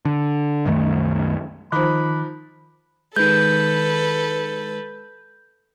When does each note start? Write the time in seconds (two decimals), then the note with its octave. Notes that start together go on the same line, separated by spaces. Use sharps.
0.05 D3
0.65 C2 F#2 D#3 A3
1.72 D#3 F3 D#4 B5 D6 F#6
3.16 D#3 G#3 A4 B4 G6